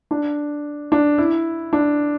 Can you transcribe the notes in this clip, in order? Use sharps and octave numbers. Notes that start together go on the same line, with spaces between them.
D4
D4
E4
D4